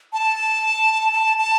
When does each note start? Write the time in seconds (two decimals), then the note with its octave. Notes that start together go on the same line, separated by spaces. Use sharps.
0.13 A5
1.13 A5
1.38 A5